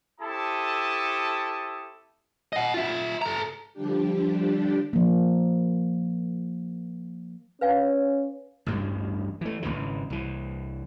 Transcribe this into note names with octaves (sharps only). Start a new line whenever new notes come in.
C4 E4 G4 A4 A5 D#6
D#5 F#5
F4 E5
A4 A#5
D3 F3 G3 D4 G4
F3 A#3
C#4 B4 F5 G#5
A1 D2 G2 G3
E3 A3
G#1 D2 C#3 E3
C2 E3